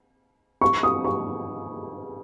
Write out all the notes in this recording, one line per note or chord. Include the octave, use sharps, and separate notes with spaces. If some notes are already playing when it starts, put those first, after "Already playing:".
C#6
D#6
C#6